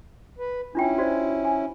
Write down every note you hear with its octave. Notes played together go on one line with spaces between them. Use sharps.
B4
C#4 D4 E4 F4 G5
F#4 C5 D5
G#5